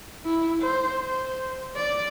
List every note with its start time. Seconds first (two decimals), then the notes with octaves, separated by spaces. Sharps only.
0.25 E4
0.62 C5
1.01 C5
1.76 D5